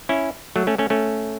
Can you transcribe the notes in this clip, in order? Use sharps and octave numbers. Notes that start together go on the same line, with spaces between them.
C#4 E4
F#3 A3
A3 C#4
A3 C#4
A3 C#4